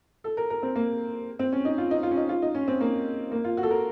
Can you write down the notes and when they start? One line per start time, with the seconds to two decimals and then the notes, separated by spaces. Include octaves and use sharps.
0.24 A4
0.37 A#4
0.50 A#4
0.63 C4
0.76 A#3
1.39 C4
1.52 C#4
1.65 D#4
1.78 F4
1.91 D#4
2.03 F4
2.11 C#4
2.17 D#4
2.29 F4
2.42 D#4
2.55 C#4
2.68 C4
2.81 A#3
3.32 A#3
3.44 F4
3.57 F#4
3.63 A4
3.70 A#4